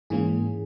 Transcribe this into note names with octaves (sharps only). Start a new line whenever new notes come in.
G#2 E3 A#3 C#4 G#4